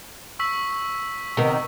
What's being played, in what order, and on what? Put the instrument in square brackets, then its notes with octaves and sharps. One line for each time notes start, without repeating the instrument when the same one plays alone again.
[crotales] C#6 E6 B6
[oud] C3 D#3 B3